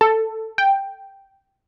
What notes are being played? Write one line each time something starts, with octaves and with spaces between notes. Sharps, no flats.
A4
G5